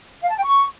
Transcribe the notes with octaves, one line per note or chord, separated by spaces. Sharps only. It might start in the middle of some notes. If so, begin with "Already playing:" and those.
F5
A5
G5
C#6